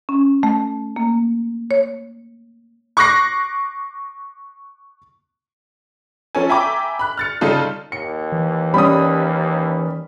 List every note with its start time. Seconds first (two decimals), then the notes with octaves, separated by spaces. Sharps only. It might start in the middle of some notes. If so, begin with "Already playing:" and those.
0.09 C#4
0.43 A3
0.96 A#3
1.71 C#5
2.97 C#6 D6 F#6 A#6 C7
6.35 F3 C#4 A4 G#5
6.49 E5 G5 G#5 A#5 B5 D6
6.99 B5 F#6
7.18 F6 A6 C#7
7.41 C#3 G3 D#4 F4 A4
7.92 D#2 C#7
8.32 E3
8.74 G3 C#4 B5 D#6